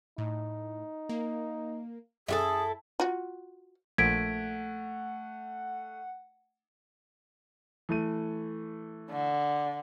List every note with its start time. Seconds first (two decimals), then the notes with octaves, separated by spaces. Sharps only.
0.18 A2 D#4
1.09 A#3
2.28 F#2 E4 F#4 G#4 A4
3.00 F4 F#4
3.98 A#1 A3 F#5 G#6 B6 D7
7.89 E3 A3 D#7
9.11 D3